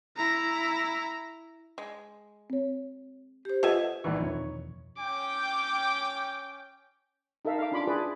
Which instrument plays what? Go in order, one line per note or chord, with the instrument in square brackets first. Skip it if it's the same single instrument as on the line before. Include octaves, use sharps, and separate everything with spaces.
[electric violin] E4 A#5
[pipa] G#3
[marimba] C4 C#5
[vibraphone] G4 C5
[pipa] B2 E5 G#5 [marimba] F4 A4
[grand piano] A#1 E3 [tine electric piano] D#3 D#4 C#6
[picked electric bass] E1 F2 A#2 [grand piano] C#5
[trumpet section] C#4 G5 [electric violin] D6
[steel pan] D#4 A4 A#4 E5 F5
F5 D6
C#4 D4 F4 B5 C6 D6
D4 E4 F4 G#4 B4 D5